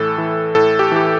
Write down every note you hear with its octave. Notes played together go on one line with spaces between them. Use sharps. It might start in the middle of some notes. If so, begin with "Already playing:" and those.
Already playing: A2 E3 A4
E3
A2 A4
G4
E3 G4